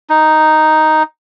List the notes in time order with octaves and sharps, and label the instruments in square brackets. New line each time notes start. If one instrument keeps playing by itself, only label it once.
[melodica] D#4